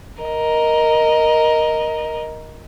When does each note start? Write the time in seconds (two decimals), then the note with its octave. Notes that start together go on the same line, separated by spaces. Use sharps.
0.22 A#4 D#5